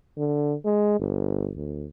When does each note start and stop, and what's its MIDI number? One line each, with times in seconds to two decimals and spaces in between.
0.17 0.54 50
0.65 0.99 56
1.00 1.51 31
1.57 1.86 38